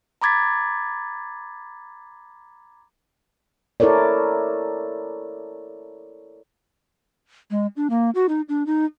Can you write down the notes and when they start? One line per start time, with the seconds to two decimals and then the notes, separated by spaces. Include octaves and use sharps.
0.21 A#5 B5 D6 G#6 A6 B6
3.80 E4 A4 A#4 C#5 D5
7.51 G#3
7.76 D4
7.90 A#3
8.15 F#4
8.29 D#4
8.49 D4
8.66 D#4